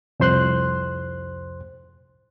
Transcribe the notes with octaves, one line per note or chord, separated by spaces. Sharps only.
C2 F2 C5 C6 F#6